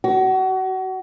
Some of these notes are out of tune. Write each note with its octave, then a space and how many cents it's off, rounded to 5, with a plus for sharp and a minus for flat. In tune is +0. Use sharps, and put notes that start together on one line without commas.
F#4 +30